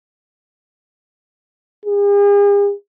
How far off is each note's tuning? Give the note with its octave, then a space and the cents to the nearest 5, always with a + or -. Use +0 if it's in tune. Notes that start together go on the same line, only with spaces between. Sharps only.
G#4 -45